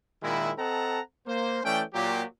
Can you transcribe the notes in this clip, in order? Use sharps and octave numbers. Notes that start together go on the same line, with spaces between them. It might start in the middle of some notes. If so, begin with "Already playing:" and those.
A#2 D#3 G#3 E4
C4 A4 D#5 F#5 A5 A#5
A#3 C5
E3 A3 C#4 D5 G5
A#2 F#3 G4